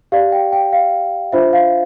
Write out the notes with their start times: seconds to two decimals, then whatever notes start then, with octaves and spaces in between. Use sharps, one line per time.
0.12 G4 D5 F5
0.32 G5
0.52 G5
0.73 F5
1.32 D4 F4 C5 E5
1.53 F5